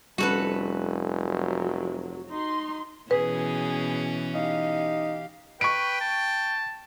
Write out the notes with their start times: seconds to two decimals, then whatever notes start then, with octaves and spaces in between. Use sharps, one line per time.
0.18 F1 G3 A#3 C#4 F#4 A4 B4
1.22 F#3
2.32 D#4 C6
3.11 B2 E3 C#4 G#4 B4
4.35 D#4 G4 F5
5.61 B4 G5 C#6 D7
6.01 A5